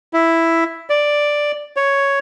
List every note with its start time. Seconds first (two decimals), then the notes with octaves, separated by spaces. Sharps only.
0.13 E4
0.90 D5
1.77 C#5